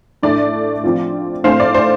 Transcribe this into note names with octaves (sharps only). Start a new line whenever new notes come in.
A2 A3 D4 D5
F3 C4 F4
A2 A3 C4 C5 F5
D5
C5